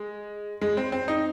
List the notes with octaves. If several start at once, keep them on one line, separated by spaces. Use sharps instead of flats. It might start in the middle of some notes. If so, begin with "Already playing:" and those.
Already playing: G#3
G#3
C4
C4
D#4